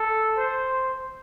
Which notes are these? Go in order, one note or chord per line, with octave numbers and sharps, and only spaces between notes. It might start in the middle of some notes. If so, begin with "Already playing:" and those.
Already playing: A4
C5